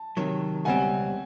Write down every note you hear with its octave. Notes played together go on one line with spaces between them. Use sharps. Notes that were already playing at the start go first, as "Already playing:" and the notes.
Already playing: A5
C3 D#3 F#3
C#2 B2 G3 C4 F#5 G#5